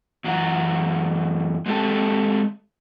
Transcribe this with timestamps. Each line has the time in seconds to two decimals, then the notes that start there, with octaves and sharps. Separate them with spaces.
0.24 F#2 E3 F#5 A5 A#5
1.66 G#3 C4 G4 A4 A5